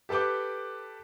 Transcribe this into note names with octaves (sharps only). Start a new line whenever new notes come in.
G4 A4 B4 D6 G6